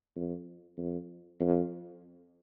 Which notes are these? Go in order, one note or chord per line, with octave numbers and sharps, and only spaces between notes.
F2
F2
F2